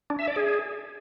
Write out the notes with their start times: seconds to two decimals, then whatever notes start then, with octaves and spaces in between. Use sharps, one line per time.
0.10 D4
0.19 E5
0.27 D5
0.36 G#4